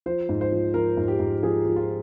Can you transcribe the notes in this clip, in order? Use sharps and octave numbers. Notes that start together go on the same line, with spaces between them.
F3 C5
G#2
C5
F3
F3 A#4
G#2
G4
G#2
F3 G#4
F3
F4